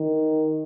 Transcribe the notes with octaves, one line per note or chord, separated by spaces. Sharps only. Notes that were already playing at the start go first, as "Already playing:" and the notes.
Already playing: D#3